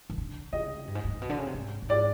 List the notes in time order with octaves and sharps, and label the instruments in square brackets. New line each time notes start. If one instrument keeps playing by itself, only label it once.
[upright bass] D#3
D3
[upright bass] C#3 [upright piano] D#5
[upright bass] G2
G#2
A2
A#2
B2
D3
C#3
C3
G#2
A2
[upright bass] G#2 [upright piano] D5